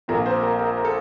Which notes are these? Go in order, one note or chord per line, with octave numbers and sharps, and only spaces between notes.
A#1 A#2 A3 C4 A#4
C5
A#4
A#4
A#4
A4